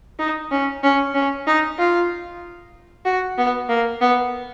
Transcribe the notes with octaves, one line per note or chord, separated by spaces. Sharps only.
D#4
C#4
C#4
C#4
D#4
F4
F#4
B3
A#3
B3